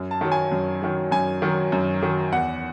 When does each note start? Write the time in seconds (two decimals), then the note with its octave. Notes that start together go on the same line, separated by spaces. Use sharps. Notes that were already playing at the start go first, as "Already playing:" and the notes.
Already playing: F#2
0.11 A5
0.21 D#3 F#3
0.32 G#5
0.52 F#2
0.82 D#3 F#3
1.11 F#2 G#5
1.42 D#3 F#3
1.72 F#2
2.02 D#3 F#3
2.32 E2 F#5